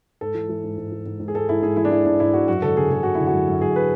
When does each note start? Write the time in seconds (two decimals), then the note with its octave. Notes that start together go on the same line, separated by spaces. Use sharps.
0.21 G#2 A4
0.35 E3
0.49 E3
0.63 G#2
0.78 G#2
0.92 E3
1.06 G#2
1.20 G#2
1.28 G#4
1.34 G#2 A4
1.49 G#2 E4
1.62 G#2 G#4
1.77 E3 E4
1.85 D4
1.91 E3 E4
2.05 G#2 D4
2.20 G#2 E4
2.33 G#2 F#4
2.48 F#2 F#4
2.62 D3 A4
2.77 D3 G#4
2.91 D3 G#4
3.03 F#2 F#4
3.15 D3 E4
3.27 F#4
3.34 F#2
3.48 F#2
3.61 F#2 G#4
3.76 B4